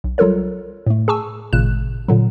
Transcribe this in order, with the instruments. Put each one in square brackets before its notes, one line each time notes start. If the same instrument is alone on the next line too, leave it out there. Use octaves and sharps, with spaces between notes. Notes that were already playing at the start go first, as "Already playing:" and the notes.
[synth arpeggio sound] B1
F#3 G3 F4 A4 A#4 C#5
A2 A3
G#4 G#5 A5 C#6 E6
G#1 A#2 C#3 G#3 F#6 E7
A#2 D3 F#3